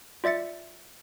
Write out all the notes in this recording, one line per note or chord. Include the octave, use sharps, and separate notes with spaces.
F4 D5 E5 A6 C#7